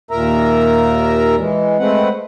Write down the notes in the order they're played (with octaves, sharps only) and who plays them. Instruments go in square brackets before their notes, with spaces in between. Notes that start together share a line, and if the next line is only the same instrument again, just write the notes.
[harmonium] D#2 A#2 A#4 E5 A#5
E3 G#3
G#3 A3 C4 B4 F#5